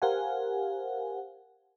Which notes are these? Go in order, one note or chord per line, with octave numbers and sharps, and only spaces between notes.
G4 A#4 C5 F5 F#5 G#5